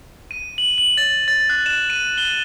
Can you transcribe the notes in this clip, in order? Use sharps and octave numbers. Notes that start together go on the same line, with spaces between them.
D#7
F#7
F#7
A6
A6
F#6
E7
D#7
G7